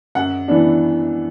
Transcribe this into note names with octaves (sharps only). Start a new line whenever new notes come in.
F#2 F#5
E3 B3 D4